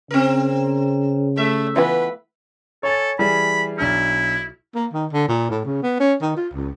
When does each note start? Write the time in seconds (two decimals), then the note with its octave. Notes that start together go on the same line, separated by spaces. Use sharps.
0.11 C#3 C4 A#4
1.37 A3 E5
1.76 E3 B3 F4 B4
2.83 A4 C#5 G#5 A6
3.19 E3 G3 G#4 B5
3.78 B1 D4 E4 F6
4.75 A#3
4.94 D#3
5.13 D3
5.28 A#2
5.50 A2
5.65 C#3
5.83 B3
6.00 C#4
6.21 D#3
6.37 F4
6.54 C#2